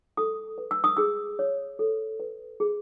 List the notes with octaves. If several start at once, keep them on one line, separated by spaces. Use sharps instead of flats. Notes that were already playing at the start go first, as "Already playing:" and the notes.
A4 D#6
B4
E6
D#6
G#4 E6
C#5
A4
B4
G#4